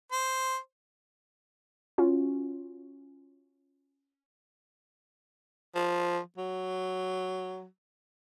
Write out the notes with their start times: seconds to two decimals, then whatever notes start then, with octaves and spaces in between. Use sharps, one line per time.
0.12 C5
1.98 C#4 F4 F#4
5.75 F3
6.37 F#3